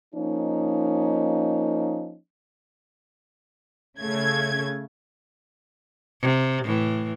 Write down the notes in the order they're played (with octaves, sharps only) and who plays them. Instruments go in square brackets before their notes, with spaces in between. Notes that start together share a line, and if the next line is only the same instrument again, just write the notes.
[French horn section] F3 A#3 C#4 D#4
[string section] C#3 A3 G#6
[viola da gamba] C3
A2 E3